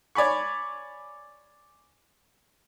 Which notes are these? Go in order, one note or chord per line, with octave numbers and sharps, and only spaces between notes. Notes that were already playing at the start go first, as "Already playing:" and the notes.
C#5 D5 G#5 B5 C#6